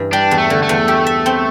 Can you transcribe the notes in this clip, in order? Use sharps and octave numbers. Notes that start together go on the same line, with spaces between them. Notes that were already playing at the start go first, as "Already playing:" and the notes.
Already playing: G2 E3
G3 D4
E2
A3
D3
A3
E2
G4
E5
C4